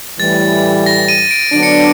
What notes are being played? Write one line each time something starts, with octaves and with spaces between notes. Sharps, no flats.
A2 E3 G3 A6
A#6
D#7
D7
D3 F#3 B3 D4 D7
C#7
D7